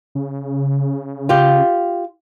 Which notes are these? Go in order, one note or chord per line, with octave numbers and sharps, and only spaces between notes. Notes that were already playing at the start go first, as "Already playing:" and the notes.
C#3
F4 G4